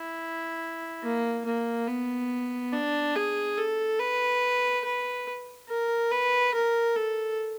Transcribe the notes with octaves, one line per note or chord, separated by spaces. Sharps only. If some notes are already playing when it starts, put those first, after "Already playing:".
Already playing: E4
A#3
A#3
B3
D4
G#4
A4
B4
B4
A#4
B4
A#4
A4